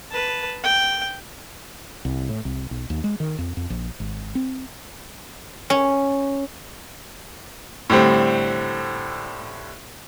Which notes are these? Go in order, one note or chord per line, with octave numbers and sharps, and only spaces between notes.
B4 A5
G5
C2
A2
C2
B1
D#2
G#3
D#3
F2
F2
A#1
G#1
C4
C#4
A2 D3 G3 C4